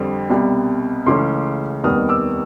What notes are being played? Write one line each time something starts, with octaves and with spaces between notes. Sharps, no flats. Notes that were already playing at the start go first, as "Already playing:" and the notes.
Already playing: F2 D3 G3 C4
C2 B2 G3
C#2 C#3 E3 A3 C#4 C6 D6
F1 D#2 D#3 G3 B3 D#6 F6
D6 E6